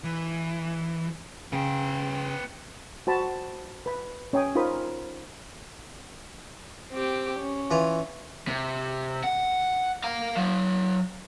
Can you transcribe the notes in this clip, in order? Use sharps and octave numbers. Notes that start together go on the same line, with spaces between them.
E3
C#3 B3 G5
F#4 C5 A5 B5
B4 B5
C#4 C#5 G5 G#5 D#6
D#4 F4 A#4 C5 B5 D#6
C4 G4
C#4
E3 F4
C3
F#5
F5 A#5
F#3 F5